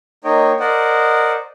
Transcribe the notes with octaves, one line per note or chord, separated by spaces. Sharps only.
A#3 D#4 C#5 D#5 G5
A#4 C5 D5 D#5 F#5